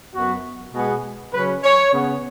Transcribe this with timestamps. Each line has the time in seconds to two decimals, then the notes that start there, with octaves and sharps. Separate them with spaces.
0.14 F#2 F#3 B3 F#4
0.74 B2 G#3 B3 G#4
1.34 C#3 F#3 C#4 B4
1.63 C#5
1.93 C#3 B3